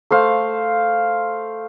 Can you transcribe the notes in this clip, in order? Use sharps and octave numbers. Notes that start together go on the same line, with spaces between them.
A3 C5 F5